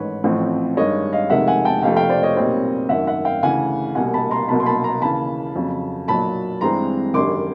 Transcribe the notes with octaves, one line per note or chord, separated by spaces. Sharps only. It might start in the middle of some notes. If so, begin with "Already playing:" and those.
Already playing: A1 G#2 D#3 B4 C#5
A1 A2 F3 A3 C4
G2 D#3 G#3 C#5 D#5
D#5 F5
F1 F2 C3 D#3 G#3 E5 F#5
F#5 G#5
G5 A5
F1 F2 C3 F3 A3 F5 G5
F5 G5
C5 D5
C#5 D#5
B1 A#2 G3 C4
G#1 F#2 D#3 E5 F#5
E5 F#5
F5 G5
D2 C#3 E3 F#5 G#5
C2 B2 G3 A#3 F#5 G#5
A5 B5
A#5 C6
C2 B2 F#3 A#3 A5 B5
C6
A5 B5
A#5 C6
D#2 C#3 E3 A5 B5
F2 C#3 F#3
B1 A#2 F#3 A5 B5
G2 E3 G#3 C4 A#5 C6
G#1 F#2 D3 G3 C6 D6